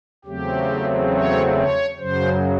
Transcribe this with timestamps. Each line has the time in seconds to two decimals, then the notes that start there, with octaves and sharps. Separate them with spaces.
0.25 E2 C#3 F#3 A3 C4 G4
1.12 C#5
1.56 C#5
1.99 F#2 C#3 F#3 C5